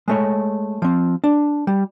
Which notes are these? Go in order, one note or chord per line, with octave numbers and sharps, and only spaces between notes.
G#3 A3 C#5
F3 C4
D4
G3